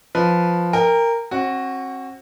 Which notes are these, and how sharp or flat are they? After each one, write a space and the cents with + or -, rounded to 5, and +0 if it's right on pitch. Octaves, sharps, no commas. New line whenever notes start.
F3 +0 B4 +0
A#4 -10 G5 +35
C4 +40 F#4 +0